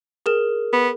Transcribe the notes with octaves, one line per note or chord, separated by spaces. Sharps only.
G#4 A#4 E7
B3